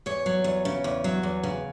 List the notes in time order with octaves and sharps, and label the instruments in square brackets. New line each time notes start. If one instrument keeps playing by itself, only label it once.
[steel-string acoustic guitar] E2 C#5
F#3
E2
C#3
E2
F#3
E2
C#3